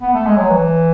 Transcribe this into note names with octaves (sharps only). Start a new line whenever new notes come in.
B3
A3
G#3
F#3
E3